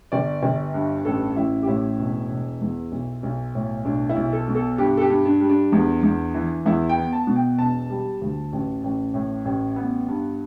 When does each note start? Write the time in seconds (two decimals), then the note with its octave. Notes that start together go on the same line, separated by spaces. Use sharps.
0.12 G1 D5
0.43 G1
0.74 G2
1.05 A1 A4
1.36 A1 E4
1.63 G4
1.68 A2 E4
1.98 E1
2.30 E1
2.61 E2
2.92 B1
3.23 B1
3.55 A2
3.85 B1 D4
4.09 E4
4.16 B1
4.33 A4
4.48 B2
4.55 A4
4.78 G2 G4
4.97 A4
5.02 G4
5.10 G2
5.25 D4
5.41 G3
5.49 D4
5.72 E2
6.03 E2
6.34 E3
6.66 E2 E4
6.89 G5
6.96 B3
7.13 A5
7.27 B2
7.36 G5
7.58 E1 A5
7.90 G3
8.22 D2
8.53 A1
8.84 A1
9.14 A2
9.45 A1
9.76 B3
10.08 G2